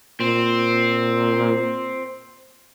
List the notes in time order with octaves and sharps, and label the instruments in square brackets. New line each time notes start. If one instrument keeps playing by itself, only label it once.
[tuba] A#2 [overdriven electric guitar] C4